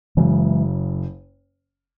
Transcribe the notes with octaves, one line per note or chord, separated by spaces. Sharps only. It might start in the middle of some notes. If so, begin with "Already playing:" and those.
F#1 F#2 C#3 E3 G#3